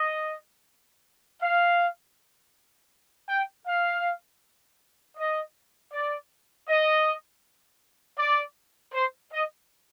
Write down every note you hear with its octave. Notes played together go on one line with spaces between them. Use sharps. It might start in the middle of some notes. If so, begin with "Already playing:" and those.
Already playing: D#5
F5
G5
F5
D#5
D5
D#5
D5
C5
D#5